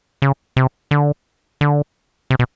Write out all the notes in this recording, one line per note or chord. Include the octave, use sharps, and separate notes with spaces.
C#3
C3
D3
D3
C3
B2